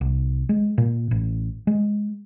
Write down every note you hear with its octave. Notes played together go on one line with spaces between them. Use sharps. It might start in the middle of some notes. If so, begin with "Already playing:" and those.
C2
G#3
A#2
A1
G#3